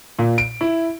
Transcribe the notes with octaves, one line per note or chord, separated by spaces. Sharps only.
A#2
D7
E4